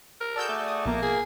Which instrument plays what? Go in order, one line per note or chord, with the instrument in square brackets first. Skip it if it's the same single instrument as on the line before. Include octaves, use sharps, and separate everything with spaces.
[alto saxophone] A#4
[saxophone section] F#4 G#4 D5 [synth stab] A4 E6 G6
[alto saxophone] A3
[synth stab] D#6
[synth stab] A#1 B2 [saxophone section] A#3
[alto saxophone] G#4